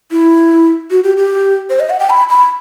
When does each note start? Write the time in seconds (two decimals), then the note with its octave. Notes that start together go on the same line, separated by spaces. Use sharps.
0.11 E4
0.91 F#4
1.04 G4
1.17 G4
1.70 C5
1.80 D#5
1.90 F#5
2.00 G5
2.10 B5
2.30 B5